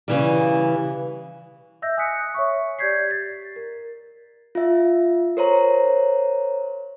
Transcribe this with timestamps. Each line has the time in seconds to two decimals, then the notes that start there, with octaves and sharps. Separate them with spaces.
0.08 C#3 E3 G3
1.82 D#5 E5 E6 G6 A#6
1.97 G#5 D#6 F#6 B6 C#7
2.34 C#5 E5 C#6
2.79 G4 D5 G6 G#6 B6 C7
3.11 A6
3.56 A#4
4.55 F4 E5
5.37 A#4 C5 C#5 A#5